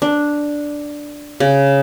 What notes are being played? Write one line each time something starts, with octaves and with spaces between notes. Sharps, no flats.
D4
C#3